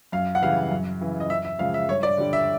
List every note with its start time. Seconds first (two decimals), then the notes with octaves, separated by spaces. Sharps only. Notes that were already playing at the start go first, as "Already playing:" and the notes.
0.12 F#2 F5
0.35 F#5
0.42 C#3 E3 G3 F5
0.71 F#2
1.01 C#3 E3
1.20 D#5
1.30 F#2 E5
1.45 E5
1.59 C#3 F3 G#3 F5
1.74 E5
1.89 G2 C#5
2.03 D5
2.17 D3 G3
2.33 E5